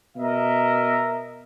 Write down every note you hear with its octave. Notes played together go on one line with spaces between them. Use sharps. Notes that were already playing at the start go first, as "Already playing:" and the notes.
B2 A#4 D#5 E5